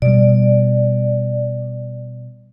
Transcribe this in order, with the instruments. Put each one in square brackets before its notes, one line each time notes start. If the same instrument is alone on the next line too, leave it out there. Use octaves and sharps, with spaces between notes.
[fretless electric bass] B2 G3 [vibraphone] D5